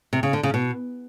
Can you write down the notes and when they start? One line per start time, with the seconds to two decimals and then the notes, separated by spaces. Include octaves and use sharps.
0.13 C3
0.23 C#3
0.33 D3
0.43 C#3
0.54 B2